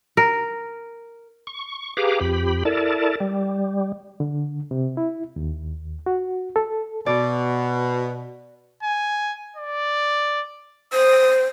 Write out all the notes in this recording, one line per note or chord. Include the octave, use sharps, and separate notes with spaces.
A#4
C#6
G4 G#4 B4 F5 A#5 D6
F2 G4 B5
E4 A4 A#4 D5 A5
G3
D3
C3
E4
D#2
F#4
A4
B2 D5
G#5
D5
C5 D#6